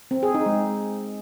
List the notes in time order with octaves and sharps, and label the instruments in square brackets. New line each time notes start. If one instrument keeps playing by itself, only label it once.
[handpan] C4
G#4
D#4
G#3